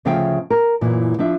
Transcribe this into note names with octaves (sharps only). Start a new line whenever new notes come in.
D2 C#3 F3 E5 F5 G5
A#4
F#2 A#2 E3
F3 D4 E5